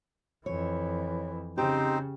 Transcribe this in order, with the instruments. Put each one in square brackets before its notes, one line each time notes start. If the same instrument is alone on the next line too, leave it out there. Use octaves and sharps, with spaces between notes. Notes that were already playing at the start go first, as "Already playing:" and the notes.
[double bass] F2 E3 [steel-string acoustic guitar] C#5
[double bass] C#3 [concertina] C4 D#4 C5 [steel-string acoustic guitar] G4